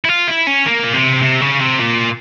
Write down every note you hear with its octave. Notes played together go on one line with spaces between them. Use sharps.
E4
F4
E4
C#4
A#3
A#2
C3
C3
C#3
C3
A#2